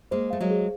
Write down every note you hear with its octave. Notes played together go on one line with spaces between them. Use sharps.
G#3 A#3 C5
A3 F5
F#3 G#3
G#4